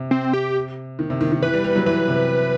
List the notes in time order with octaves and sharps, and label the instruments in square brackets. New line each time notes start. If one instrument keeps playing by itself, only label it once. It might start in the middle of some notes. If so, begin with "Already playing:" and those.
Already playing: [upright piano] C3
[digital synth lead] C4
G4
[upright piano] D#3
C3
D#3
D#3
[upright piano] E3 [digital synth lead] B4
[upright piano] G3
G3
F#3
[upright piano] E3 [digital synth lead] B4
[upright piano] C3